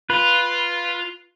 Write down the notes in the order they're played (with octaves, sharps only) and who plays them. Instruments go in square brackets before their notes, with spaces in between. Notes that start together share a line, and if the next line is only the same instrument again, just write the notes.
[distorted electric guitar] F4 [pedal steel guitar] B4